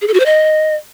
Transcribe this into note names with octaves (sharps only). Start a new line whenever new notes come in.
G#4
A4
F#4
C5
D#5